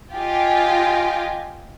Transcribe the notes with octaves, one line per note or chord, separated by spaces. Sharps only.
F4 G4 D#5 G5 G#5